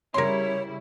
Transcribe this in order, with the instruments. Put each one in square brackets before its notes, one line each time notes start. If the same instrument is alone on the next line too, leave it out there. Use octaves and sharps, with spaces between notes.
[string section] C#3 G3 E4 [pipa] A#4 C6 [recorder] C#5